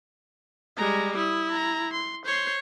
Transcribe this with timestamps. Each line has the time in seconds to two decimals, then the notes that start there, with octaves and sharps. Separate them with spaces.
0.77 G3 G#3 A#5
1.17 E4 D#6
1.52 A#5
1.93 C6
2.25 C5 C#5 C6